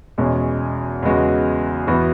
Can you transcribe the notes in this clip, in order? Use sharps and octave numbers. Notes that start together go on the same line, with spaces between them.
E2 B2 G#3 C#4
E2 C#3 G#3 B3 F#4
E2 E3 B3 F#4